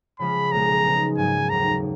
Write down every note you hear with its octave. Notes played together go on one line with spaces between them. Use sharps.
C#3 F3 G#3 C#4 B5
B1 A#2 G#3 A#5
C#3 G#3 B3 D#4
G#2 F#3 A#3 G#5
F1 D#2 C#3 A#5